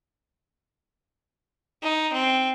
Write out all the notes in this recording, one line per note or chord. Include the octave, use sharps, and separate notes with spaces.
D#4
C4